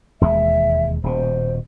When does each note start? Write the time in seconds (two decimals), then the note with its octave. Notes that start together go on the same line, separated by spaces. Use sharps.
0.21 E1 D#2 G#3 E5
1.04 D#1 B2 C5